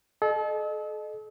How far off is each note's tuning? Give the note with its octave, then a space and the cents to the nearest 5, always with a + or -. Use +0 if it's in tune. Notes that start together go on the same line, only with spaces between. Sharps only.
A4 -40 D#5 -25